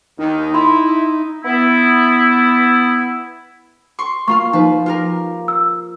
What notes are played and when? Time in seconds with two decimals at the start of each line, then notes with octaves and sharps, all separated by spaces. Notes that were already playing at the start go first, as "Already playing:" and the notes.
0.19 D#2 D#3 D#4
0.54 E4 B5 C6
1.44 B3 E4
3.99 C6 C#6
4.28 A#3 F4 F5 C#6
4.53 F3 D#4 B4
4.86 F4 G4 A#4
5.48 E6